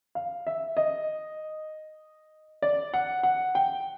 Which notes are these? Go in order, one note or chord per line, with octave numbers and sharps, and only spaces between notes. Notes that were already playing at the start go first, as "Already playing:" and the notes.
F5
E5
D#5
D5
F#5
F#5
G5